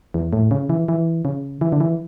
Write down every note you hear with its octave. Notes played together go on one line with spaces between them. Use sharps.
E2
A2
C#3
E3
E3
C#3
E3
D3
E3